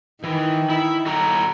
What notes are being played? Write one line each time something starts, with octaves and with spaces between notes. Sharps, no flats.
D#3 E3
E4
F#4 A4 A#5